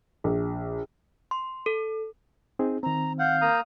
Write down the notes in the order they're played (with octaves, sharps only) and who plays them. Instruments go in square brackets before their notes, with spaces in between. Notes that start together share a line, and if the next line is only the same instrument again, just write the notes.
[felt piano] A#1
[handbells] C6
A4
[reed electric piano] C4 D#4 G#4
[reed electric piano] D#3 C4 [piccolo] A#5
[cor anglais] F5 [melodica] F#5 [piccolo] G6
[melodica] A#3 A#5 D#6